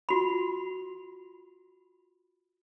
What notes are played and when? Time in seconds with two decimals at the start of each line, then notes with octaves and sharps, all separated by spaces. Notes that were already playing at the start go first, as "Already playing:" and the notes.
0.09 F4 F#4 B5